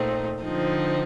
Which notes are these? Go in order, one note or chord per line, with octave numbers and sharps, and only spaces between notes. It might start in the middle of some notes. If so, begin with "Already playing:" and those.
Already playing: A#2 A3 C4 D#4
D3 F3 C4 D#4